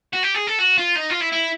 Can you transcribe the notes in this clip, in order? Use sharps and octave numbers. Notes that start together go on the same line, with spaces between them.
F#4
G4
G#4
A4
F#4
F4
D#4
F4
E4
E4